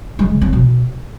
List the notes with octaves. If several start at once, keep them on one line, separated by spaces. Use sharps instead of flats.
G#3
C#3
C4
B2